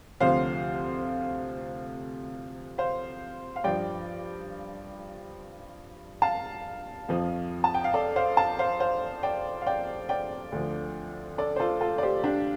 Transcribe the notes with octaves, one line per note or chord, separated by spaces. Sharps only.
D2 C3 F3 C5 F5
C5 F5
F5
G2 F3 D5 G5
F5 A5
F2 F3
A5
G5
F5
A4 D5
C5 F5
F5 A5
C5 F5
C5 F5
D5 G5
F5
D5 G5
D5 G5
D2 D3 F3
A4 D5
C5
F4 A4
F4 A4
D5
G4 C5
D4 G4